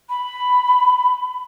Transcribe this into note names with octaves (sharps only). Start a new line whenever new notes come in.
B5